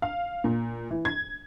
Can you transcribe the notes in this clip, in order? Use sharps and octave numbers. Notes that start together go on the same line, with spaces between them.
F5
A#2
E3
G#6